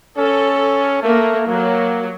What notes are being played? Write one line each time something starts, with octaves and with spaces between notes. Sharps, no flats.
C#4 A4
A3 A#3
F#3 A#3